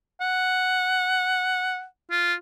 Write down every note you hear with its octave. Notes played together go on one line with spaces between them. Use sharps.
F#5
F4